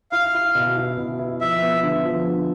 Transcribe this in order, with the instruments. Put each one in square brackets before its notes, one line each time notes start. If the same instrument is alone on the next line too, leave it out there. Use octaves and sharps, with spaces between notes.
[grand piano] E4 [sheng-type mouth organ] F5
[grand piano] E4
B2
E4
B2
E4
[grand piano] F3 [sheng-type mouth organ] E5
[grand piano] B3
D3
F3
D3